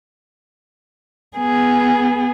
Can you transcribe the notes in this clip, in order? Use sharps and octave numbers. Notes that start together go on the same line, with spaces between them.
B3 G#4